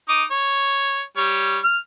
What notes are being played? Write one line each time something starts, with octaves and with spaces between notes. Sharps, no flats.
D#4 D6 D#6
C#5
G3 C#5
F6